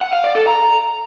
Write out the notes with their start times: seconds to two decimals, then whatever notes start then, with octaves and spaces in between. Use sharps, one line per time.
0.01 F#5
0.13 F5
0.24 D5
0.35 A4
0.47 A#5